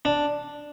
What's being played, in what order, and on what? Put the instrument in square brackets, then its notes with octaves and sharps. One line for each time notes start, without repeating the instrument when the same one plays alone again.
[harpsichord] D4